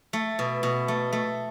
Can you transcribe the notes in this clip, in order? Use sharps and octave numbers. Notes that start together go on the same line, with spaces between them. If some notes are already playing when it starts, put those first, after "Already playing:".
A3
B2
B2
A3
A3